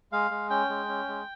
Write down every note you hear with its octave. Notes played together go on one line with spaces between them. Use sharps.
G#3 F5
G#3
C#4 G5
G#3
C#4
G#3